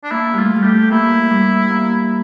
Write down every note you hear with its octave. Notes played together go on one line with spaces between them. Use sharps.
D4
A#3 E4
G3 A3 F4
G3
A3 G4
A#3 E4
G3
A#3